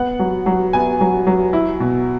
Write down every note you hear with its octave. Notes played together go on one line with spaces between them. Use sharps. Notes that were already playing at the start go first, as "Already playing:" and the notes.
Already playing: B3 F#5
F#3
F#3
B3 G#5
F#3
F#3
E4
B2